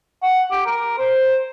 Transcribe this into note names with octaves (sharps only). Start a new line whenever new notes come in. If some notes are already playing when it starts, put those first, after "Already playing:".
F#5
G4
A#4
C5